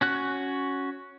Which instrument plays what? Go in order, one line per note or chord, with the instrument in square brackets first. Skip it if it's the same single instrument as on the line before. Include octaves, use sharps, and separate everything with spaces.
[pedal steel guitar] C#4 F#4 F#6